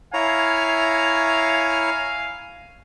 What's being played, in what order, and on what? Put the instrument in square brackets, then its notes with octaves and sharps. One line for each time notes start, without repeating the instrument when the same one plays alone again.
[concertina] E4 C#5 A#5 [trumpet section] F5 G#5